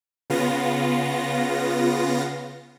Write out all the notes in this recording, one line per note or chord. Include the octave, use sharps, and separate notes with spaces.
C#3 B3 F4 A#6